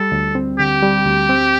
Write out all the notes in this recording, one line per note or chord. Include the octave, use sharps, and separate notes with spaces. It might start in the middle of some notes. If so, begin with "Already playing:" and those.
Already playing: G3 A4
D2
C4
D3 G4
G3
D2
C4